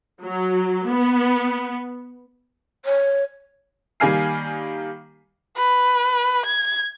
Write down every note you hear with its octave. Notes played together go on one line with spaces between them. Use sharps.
F#3
B3
C#5
D#3 G3 A#3 G#5 F6 C7
B4
G#6